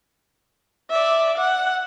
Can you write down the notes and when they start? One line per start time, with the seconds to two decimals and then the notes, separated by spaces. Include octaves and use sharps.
0.91 D5 E5
1.38 F#5